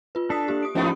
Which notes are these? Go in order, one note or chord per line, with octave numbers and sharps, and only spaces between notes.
F4 B4
D4 A4 D#6 B6 C7
A#3 G4
D#6 D7
G#2 F3 B3 C#4 D#4 G4 C#6